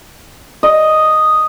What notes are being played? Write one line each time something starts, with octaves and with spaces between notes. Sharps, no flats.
D#5